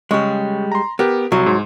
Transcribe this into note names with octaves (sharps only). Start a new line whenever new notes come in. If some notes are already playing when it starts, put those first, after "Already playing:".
C#3 G3 G#3 C#6
A#5 C6
B3 G4 A#4
C2 F#3
G#2 C6